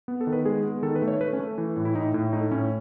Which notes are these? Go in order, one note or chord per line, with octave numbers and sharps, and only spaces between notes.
B3
A4
D#3
B4
G#3 G#4
B3
D#3 A4
B4
A3
C#5
A3 B4
C#4
A3
E3
A2
E4
A2 D#4
A2
A3 D#4
A2 C#4